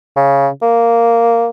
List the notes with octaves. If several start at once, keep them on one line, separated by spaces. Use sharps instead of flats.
C#3
A#3